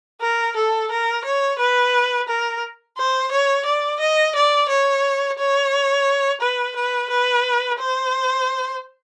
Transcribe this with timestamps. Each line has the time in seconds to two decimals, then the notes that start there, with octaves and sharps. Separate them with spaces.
0.21 A#4
0.57 A4
0.91 A#4
1.25 C#5
1.59 B4
2.28 A#4
2.98 C5
3.32 C#5
3.66 D5
4.00 D#5
4.36 D5
4.69 C#5
5.39 C#5
6.41 B4
6.76 B4
7.10 B4
7.79 C5